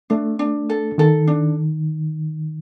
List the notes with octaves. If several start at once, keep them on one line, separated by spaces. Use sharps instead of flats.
A3 D4
D4
A4
D#3 A4
D4